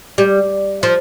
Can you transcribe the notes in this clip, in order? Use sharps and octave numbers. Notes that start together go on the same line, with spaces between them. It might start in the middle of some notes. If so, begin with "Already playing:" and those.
G3
F3